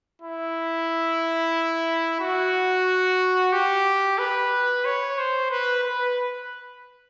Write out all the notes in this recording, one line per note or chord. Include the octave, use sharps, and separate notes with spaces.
E4
F#4
G4
B4
C#5
C5
B4
B4